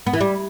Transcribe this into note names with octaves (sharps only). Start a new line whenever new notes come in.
B3
E3
G3